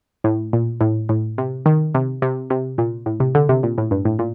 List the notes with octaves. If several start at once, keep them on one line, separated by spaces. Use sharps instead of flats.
A2
A#2
A2
A2
C3
D#3
C3
C3
C3
A#2
A2
C3
D3
C3
A#2
A2
G2
A2
A#2